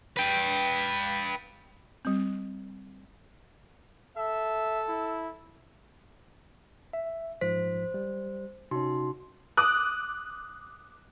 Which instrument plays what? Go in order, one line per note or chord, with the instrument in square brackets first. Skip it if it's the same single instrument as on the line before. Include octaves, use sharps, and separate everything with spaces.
[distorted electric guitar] B4 G5
[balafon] G3 C4
[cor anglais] A4 [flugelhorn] E5
[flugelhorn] E4
[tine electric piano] E5
[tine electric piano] G#2 F3 B6 [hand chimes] C5
[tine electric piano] G3
[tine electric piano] C3 C#4 [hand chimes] D#4 F#4 C6
[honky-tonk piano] D6 D#6 F#6